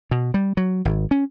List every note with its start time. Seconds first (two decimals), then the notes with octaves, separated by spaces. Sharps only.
0.11 B2
0.34 G3
0.57 F#3
0.85 G#1
1.11 C#4